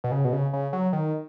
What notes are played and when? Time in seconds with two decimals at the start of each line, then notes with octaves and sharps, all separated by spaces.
0.04 B2
0.12 C#3
0.25 B2
0.33 C#3
0.53 C#3
0.73 F#3
0.93 D#3